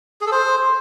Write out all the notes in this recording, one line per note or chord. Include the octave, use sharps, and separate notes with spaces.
G#4
A4
C5